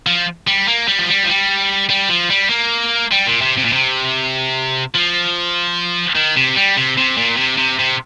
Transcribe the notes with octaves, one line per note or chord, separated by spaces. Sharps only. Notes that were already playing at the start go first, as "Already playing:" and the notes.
F3
G3
A#3
G3
F3
G3
F3
G3
G3
F3
G3
A#3
G3
A#2
C3
C3
A#2
C3
F3
D#3
C3
G3
C3
C3
A#2
C3
C3
C3